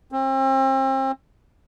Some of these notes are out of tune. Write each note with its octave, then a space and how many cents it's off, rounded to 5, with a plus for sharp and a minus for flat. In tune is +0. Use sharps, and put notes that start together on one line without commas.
C4 +35